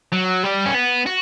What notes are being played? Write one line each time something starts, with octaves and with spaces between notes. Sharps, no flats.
F#3
G3
C#4
B3
F#4